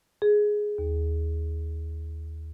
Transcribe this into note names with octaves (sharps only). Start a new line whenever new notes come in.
G#4
D#2